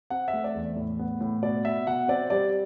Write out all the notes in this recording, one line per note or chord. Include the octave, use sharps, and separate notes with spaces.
C4 F#5
E5
A3
D5
E2
A2
B3
A2
B2 D5
B3 E5
B2 F#5
C4 D5
G3 D5